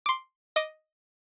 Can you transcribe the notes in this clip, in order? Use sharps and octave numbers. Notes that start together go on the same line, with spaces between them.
C6 D6
D#5 D6